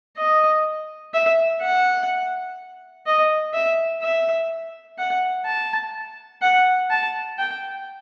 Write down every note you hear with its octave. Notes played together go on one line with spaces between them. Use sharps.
D#5
E5
F#5
D#5
E5
E5
F#5
A5
F#5
A5
G5